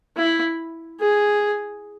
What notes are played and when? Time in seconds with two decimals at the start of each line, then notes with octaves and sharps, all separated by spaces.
0.17 E4
1.00 G#4